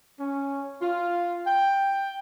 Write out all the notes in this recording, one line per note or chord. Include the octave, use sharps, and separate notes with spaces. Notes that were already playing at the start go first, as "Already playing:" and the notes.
C#4
F4
G5